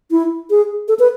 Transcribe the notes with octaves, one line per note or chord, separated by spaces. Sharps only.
E4
G#4
A4
B4